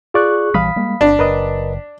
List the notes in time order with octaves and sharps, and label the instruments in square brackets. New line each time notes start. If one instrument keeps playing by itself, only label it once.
[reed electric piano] F4 D5 [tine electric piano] G#4 C#6 F#6
[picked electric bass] A#1 E3 G3 [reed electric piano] F5 B5 D#6 [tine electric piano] B6
[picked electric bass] G3 G#3 A#3
[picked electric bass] G1 [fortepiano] D4
[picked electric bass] F#1 [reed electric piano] A#4 B4 D#5